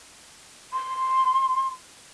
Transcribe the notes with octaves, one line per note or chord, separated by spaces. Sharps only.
C6